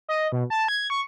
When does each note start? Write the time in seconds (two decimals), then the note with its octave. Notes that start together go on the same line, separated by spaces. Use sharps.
0.09 D#5
0.32 B2
0.50 A5
0.68 G#6
0.90 C#6